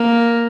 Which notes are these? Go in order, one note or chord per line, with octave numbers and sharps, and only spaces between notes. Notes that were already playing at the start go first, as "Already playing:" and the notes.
Already playing: A#3